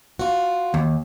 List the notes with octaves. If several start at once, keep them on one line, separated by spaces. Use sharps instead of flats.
F4 F#4
D#2